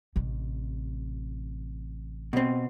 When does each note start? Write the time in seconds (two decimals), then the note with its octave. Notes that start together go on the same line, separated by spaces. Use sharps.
0.16 A1 C3
2.33 B2 C4